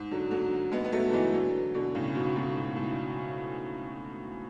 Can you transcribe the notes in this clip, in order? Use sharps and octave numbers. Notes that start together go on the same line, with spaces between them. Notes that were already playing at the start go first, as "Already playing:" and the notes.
Already playing: G#2
D3 F#3
D3 F#3
G#3 B3
B3
F#3 A3
F#3
E3 G#3
D3 F#3
B2 D3
A2 C#3
G#2 B2
C#3
G#2 B2
G#2 B2
A2 C#3